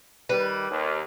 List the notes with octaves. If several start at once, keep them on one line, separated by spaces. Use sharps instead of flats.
D#3 G3 B4
D#2